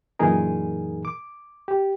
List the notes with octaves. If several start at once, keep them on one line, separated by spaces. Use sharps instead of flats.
F#2 A#2 E3 D#4 G#4 A#4
D6
G4